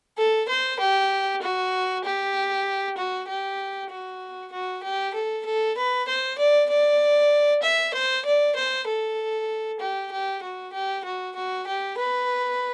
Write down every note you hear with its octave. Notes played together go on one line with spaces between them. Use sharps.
A4
C5
G4
F#4
G4
F#4
G4
F#4
F#4
G4
A4
A4
B4
C5
D5
D5
E5
C5
D5
C5
A4
G4
G4
F#4
G4
F#4
F#4
G4
B4